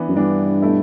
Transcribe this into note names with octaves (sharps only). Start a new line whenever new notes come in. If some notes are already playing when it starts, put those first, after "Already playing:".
Already playing: E3 B3 D4
F#2
G2 E3 B3 D4
B2 A3 E4